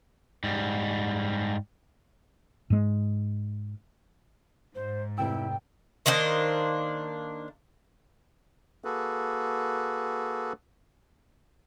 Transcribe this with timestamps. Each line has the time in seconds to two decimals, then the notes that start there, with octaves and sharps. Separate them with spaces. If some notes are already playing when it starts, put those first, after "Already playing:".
0.44 G#2 G3
2.70 G#2 G#3
4.75 G#2 C5
5.18 F1 C3 E4 G5 E6
6.06 D#3 A#3 D4 C5
8.84 A#3 F#4 G#4 A4 B4